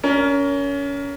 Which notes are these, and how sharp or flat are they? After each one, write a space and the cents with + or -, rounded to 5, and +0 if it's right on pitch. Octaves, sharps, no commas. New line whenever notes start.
C#4 +25 A#4 +0